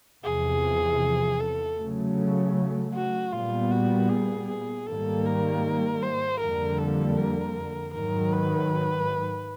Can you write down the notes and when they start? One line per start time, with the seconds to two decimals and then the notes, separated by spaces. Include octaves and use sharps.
0.24 E2 C3 F3 G#4
1.40 A4
1.78 C#3 F#3 A3
2.94 F#4
3.32 A#2 G3 B3 F4
3.71 F#4
4.09 G#4
4.48 G#4
4.87 G#2 D#3 G3 A#3 A4
5.25 A#4
6.02 C5
6.40 F2 D3 G3 A#3 A#4
6.78 A4
7.17 A#4
7.94 G#2 D#3 F#3 A#4
8.32 B4